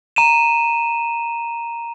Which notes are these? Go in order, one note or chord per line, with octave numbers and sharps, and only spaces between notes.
A#5 D#7 E7